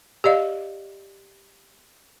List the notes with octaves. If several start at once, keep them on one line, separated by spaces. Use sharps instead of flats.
G4 D5 D#5 F5